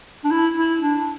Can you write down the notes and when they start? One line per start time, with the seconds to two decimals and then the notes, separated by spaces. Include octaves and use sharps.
0.25 D4
0.31 E4
0.56 E4
0.80 D4